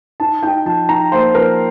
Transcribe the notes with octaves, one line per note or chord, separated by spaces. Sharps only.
D#4 A5
D#4 G5
F3 A5
D#4 A#5
A#3 C5
F3 A#4